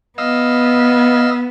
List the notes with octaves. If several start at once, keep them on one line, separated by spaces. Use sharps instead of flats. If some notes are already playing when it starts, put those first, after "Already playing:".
B3 D#5 F5 E6